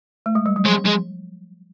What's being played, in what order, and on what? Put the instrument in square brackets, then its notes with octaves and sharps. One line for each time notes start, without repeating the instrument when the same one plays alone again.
[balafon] A3
G#3
G3
F#3
[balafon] F3 [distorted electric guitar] G#3
[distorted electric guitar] G#3